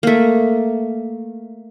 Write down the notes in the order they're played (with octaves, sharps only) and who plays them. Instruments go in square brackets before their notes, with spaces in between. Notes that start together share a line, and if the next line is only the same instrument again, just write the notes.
[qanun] A3 A#3